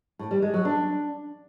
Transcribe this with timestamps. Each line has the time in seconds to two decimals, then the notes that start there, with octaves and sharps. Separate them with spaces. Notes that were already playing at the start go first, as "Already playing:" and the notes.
0.19 A2
0.31 G3
0.42 G#3
0.54 F#3
0.65 D4